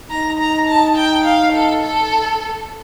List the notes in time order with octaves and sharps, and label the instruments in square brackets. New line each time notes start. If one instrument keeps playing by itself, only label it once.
[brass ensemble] D#4 [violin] A#5
[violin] A#5
A5
G5
F5
A4
A4